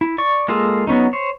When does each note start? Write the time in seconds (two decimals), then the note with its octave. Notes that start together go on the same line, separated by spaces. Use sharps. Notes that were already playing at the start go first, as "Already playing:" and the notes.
0.01 E4
0.18 D5 C#6
0.48 G#3 A#3 F4 G#4 A4
0.87 F#3 B3 C#4 D#4
1.13 C5 C#5